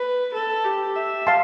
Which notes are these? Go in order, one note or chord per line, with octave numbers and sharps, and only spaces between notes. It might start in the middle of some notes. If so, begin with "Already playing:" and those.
Already playing: B4
A4
G4
E5
F5 A5 C6